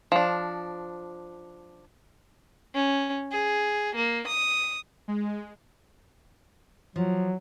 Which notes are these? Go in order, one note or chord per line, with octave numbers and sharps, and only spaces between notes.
F3 D4
C#4
G#4
A#3
D#6
G#3
F3 F#3